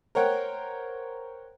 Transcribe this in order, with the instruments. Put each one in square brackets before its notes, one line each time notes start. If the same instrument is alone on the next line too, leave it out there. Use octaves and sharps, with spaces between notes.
[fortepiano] A#4 C5 C#5 F#5 G5